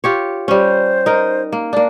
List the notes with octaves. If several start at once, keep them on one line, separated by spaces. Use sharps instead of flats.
F4 G4 C#5
G3 C#4 C5
D#4 A#4
A#3
A#3 D4 D5